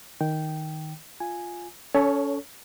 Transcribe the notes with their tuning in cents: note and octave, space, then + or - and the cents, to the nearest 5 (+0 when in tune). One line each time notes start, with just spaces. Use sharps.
D#3 +0 G5 -10
F4 +0 G#5 +0
C#4 +25 A4 +0 C#5 +0